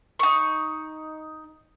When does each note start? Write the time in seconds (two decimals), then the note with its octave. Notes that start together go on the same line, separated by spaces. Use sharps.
0.19 D#4 C#6